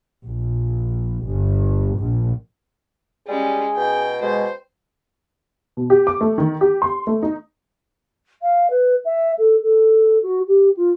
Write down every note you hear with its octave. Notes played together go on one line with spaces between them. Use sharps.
A#1
G1
A#1
G3 G#3 C#4 G#4
B2 G5
B2 G#3 C5
B2
G4
D6
A3
D#3
G4
C6
A3
D#4
F5
B4
E5
A4
A4
F#4
G4
F4